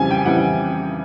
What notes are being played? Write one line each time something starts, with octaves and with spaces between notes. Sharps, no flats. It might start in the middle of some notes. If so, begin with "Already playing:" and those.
Already playing: F2 C#3 E3 G3 G#5
G5
F2 C#3 E3 G3 F#5